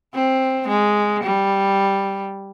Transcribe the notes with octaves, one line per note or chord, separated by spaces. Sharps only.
C4
G#3
G3